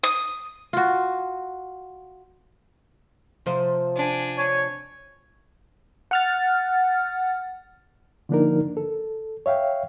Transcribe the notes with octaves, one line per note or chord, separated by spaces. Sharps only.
D#6
F4 F#4
C3 F3 C5
D4 G#5
C#5
F#5 F6 A6
D3 F3 A#3 D4 D#4 A#4
A4
C#5 E5 F5 G5